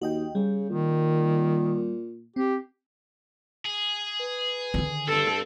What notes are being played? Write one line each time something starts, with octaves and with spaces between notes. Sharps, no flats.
D#2 F#4 D#5 G5
C#3 G3
A#2 D#3
C4 G4
G#4
B4
D3 D#3
G2 C4 A4